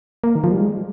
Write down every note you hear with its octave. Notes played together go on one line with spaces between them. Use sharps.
A#3
D#3
F3
G3
G#3